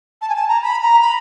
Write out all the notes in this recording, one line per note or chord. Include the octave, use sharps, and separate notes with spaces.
A5
G#5
A5
A#5
B5
A#5
B5